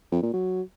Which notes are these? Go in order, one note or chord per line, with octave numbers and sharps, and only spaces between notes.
F2
A#2
F#3